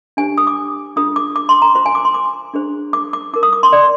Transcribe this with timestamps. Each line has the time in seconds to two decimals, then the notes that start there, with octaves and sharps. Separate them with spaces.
0.17 D4 G4 C5 G#5
0.38 D#6
0.47 D6
0.96 D4 F4 G#4 D#6
1.16 D6
1.36 D6
1.49 C6
1.62 A#5
1.75 F4 C5 C6
1.86 G#5
1.95 D6
2.05 C6
2.14 D6
2.54 D4 G#4 C5
2.93 D6
3.13 D6
3.33 D#4 A#4 D6
3.43 D#6
3.53 D6
3.63 C6
3.73 D5